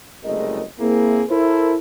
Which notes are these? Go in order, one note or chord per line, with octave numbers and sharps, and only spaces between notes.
F#1 C2 G#3 A3 A#4 D#5
A#3 C4 E4 G#4
E4 A4 A#4 C5